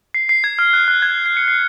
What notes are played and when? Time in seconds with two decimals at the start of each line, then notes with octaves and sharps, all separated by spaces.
0.14 C7
0.29 C7
0.44 G#6
0.59 F6
0.73 F#6
0.88 F#6
1.02 G#6
1.26 C7
1.37 C#7
1.48 C7